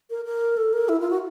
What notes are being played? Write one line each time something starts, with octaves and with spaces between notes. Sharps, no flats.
A#4
A#4
A4
A#4
E4
F4
F#4